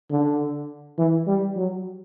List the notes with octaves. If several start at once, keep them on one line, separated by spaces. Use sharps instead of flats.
D3
E3
G3
F#3